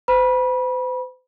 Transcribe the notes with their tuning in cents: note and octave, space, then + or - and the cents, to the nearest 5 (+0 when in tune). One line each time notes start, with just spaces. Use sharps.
C5 -45 B5 -25